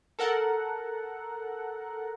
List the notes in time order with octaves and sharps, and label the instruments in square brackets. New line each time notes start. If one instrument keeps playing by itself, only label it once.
[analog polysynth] A4 A#4 F#5